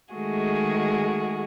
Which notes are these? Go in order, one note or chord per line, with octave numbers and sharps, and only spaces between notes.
D#3 G#3 A3 F#4 G#4